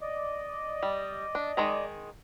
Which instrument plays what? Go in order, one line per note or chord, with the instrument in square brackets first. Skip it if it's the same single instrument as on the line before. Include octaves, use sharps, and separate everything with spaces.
[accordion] D5 D#5
[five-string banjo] G3
D4
D#3 G#3 A#5